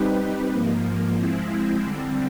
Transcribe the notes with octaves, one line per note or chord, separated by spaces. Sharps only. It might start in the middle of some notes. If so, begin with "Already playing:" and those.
Already playing: G3 C4 D#4 G4 B4
G#2 F3 A#3
F3 G#3 C4 E4
D3 G3 C4